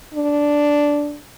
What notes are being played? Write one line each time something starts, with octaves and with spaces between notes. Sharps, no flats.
D4